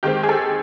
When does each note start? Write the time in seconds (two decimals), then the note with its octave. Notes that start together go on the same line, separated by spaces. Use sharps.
0.03 D#3 G#3 C4 G4
0.23 G#4
0.29 A4